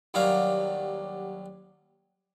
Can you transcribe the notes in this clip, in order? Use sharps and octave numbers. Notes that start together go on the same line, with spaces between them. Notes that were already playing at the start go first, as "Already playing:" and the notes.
D#2 F#3 G3 D4 F5